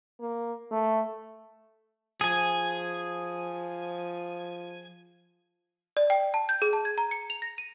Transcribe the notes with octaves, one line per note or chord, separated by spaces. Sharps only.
A#3
A3
F3 G#4 G#5
D5
G5
A5
G6
G#4
A5
G#6
A#5
C#7
F7
A#6
D#7